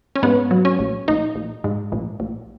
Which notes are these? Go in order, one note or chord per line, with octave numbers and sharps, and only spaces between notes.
C#4
G#2 B3
F#3
C#4
A#1
A#1 D#4
A#1
G#2
A#1
A#1